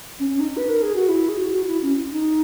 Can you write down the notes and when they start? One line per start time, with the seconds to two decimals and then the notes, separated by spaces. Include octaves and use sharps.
0.19 C#4
0.29 C#4
0.40 D#4
0.57 B4
0.69 A#4
0.82 G#4
0.95 F#4
1.08 E4
1.29 G#4
1.38 F#4
1.52 F#4
1.67 E4
1.82 C#4
2.12 D#4